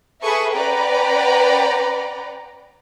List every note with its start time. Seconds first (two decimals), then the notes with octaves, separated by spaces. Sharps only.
0.22 G#4 A4 B4 E5 C#6 D#6
0.54 C#4 B4 D5 F#5 G5 A#5